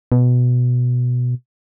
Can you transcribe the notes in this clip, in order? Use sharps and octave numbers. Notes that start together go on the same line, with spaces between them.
B2